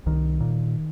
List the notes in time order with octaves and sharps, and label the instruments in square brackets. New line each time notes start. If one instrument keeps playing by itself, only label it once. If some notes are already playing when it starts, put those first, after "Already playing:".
[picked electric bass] C2 D#3
A#2